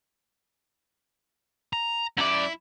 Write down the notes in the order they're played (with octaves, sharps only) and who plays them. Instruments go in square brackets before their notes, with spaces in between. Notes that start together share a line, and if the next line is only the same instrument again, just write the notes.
[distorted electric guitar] A#5
[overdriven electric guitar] F#2 D5 [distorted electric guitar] E4